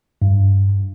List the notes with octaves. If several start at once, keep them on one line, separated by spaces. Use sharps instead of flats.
G2